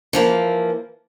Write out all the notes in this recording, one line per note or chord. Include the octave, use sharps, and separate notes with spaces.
E3 F3 A#3